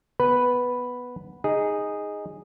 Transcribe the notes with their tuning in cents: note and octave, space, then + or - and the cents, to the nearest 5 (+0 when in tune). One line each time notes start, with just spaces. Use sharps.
B3 +0 B4 +0
D#4 +0 G#4 -10